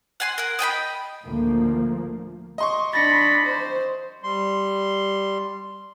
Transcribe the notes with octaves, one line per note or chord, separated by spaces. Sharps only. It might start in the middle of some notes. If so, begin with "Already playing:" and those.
F#5 G#5 C6
A#4 F#5
D#5 G5 G#5 B5
D2 A2 F3 A3 A#3
D#5 C6 C#6
D4 B5 A6 A#6 C#7
C5
G3 C6